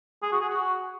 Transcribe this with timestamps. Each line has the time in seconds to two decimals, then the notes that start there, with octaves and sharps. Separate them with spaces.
0.23 G#4
0.32 F#4
0.41 G#4
0.50 F#4